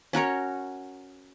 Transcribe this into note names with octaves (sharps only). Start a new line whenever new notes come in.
C#4 F#4 A#4 C#5